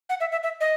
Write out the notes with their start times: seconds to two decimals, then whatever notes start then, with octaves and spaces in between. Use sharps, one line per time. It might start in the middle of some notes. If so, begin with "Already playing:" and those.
0.09 F#5
0.20 E5
0.32 E5
0.43 E5
0.61 D#5